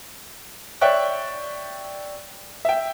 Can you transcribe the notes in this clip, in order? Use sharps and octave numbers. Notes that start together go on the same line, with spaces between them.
C#5 D5 E5 G5 C#6 F#6
E5 G5